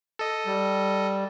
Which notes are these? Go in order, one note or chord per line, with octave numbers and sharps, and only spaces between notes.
A4 D#5
G3